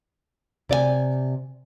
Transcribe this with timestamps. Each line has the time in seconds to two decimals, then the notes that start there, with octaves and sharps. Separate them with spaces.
0.69 C3 D5 D#5 G#5